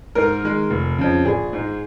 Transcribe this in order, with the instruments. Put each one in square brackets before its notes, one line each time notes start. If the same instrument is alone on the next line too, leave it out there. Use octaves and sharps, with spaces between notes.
[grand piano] G#2 [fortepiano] A#4
[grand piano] D#3 G#3
F1
F2 C#3
[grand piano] A#1 [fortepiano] G#4
[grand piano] G#2 G#3